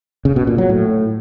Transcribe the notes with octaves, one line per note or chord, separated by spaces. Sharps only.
C#3
B2
A#2
F#3
A2